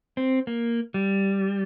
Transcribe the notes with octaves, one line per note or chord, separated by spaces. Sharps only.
C4
A#3
G3